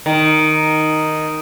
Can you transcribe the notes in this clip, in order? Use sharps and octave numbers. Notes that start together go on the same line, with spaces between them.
D#3